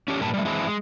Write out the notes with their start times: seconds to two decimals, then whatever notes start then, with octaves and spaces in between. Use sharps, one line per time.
0.08 C#4 D4 G4
0.20 G2 A#2 B4 A5
0.34 G3 A3
0.45 E3 G#3 C4 D4 E4
0.67 G#3